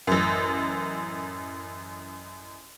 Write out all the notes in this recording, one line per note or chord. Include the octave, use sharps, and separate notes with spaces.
A1 F#2